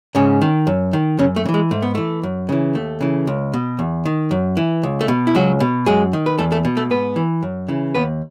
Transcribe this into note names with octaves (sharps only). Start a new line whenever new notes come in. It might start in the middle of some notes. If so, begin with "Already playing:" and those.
G#2 C#3 C#4
D#3
F#2
D#3
F#2 C#3 C#4
A3
C#3
E3
G#3
G#2 A3
B3
E3 A3
F#2
C#3 E3
D#2 A3
C#3 E3
C#2
B2
E2
D#3
F#2
E3
C#2
A3
B2
E4
C#2 F#3 F#4
B2
F#2 G#3 G#4
D#3
B4
E2 A3 A4
A3 A4
B2
A3 A4
G#2 B3 B4
E3
F#2
C#3 E3
D#2 B3 B4